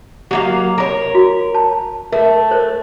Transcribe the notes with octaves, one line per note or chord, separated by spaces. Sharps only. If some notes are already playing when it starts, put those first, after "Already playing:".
F#3 A#3 G4 F5
A#4 C#5
F#4
A5
A3 A#4
A#4 C5